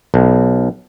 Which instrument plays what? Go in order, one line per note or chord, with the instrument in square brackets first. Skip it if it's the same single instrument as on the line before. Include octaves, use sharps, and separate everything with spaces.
[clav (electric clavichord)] B1